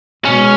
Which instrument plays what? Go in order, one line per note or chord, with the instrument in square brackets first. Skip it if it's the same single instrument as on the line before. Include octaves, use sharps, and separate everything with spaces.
[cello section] B2 G#3 [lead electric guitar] C#4